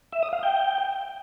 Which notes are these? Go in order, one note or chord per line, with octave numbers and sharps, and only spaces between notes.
E5
D#6
F5
G5